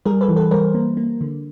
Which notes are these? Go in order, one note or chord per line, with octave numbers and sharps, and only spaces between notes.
G3 G#4 A#4
A4 B4
E3
A4 B4
G3 A#4 C5
A#3
A#3
D3